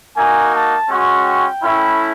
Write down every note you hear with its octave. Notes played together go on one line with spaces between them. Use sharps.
A#3 D#4 F#4 G#5
A5
G#3 C#4 F#4
G5
A3 C#4 E4